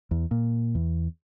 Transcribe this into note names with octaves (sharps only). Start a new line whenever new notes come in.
E2
A#2
E2